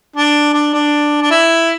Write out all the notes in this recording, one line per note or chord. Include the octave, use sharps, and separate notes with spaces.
D4
D4
D4
D4
E4